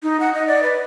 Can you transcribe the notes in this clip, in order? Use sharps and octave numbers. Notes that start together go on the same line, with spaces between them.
D#4
F#5
D#5
D5
B4